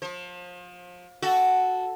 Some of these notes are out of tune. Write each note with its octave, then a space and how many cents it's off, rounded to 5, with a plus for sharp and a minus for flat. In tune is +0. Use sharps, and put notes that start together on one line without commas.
F3 +30 C5 +40
F#4 +0 A4 +0